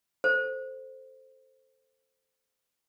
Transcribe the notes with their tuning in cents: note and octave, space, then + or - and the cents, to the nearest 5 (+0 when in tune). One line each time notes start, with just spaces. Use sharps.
A4 +0 C5 +0